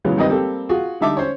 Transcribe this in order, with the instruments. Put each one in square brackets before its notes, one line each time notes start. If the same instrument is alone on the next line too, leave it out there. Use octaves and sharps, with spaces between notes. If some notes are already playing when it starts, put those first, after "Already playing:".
[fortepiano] C#3 E3 F#3 G#3 B3 F4
G2 D#3 C4 D#4 B4 D#5
G3 A#3 C4 G4 A4
F4 F#4 G#4
D3 G3 D#4 E5 A5 D6
C#4 C5 C#5